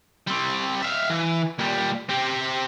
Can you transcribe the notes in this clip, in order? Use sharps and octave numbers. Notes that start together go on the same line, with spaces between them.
G3 C4
E5 F5
E3
A#2 G3
C4 G4